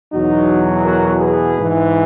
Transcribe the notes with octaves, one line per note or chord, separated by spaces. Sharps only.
E2 B2 F#3 D#4 F#4
F#4 A#4
G#4 B4
G#2 E3